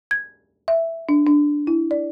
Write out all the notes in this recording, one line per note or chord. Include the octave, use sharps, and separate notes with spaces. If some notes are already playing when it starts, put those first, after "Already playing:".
G#6
E5
D4
D4
E4
D5